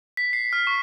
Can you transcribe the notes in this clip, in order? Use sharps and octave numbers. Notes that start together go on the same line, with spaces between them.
B6
C7
F6
C#6